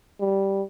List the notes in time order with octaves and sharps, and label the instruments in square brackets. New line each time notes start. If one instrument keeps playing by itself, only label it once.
[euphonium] G3